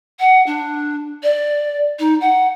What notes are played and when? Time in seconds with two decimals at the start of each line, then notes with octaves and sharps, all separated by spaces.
0.20 F#5
0.46 D4
1.23 D5
1.99 D#4
2.21 F#5